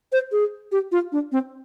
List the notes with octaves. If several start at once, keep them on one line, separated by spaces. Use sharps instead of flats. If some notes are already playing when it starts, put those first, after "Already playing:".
C5
G#4
G4
F4
D4
C4